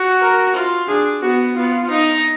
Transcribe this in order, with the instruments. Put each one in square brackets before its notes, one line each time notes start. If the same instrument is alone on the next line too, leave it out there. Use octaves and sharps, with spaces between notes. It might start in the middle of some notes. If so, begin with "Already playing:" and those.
Already playing: [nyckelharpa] F#4
[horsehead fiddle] A#4
[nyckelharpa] F4
[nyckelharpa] D4 [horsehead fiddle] G#4
[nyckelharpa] B3 [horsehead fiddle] F#4
[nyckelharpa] B3 [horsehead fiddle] F4
[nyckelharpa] D#4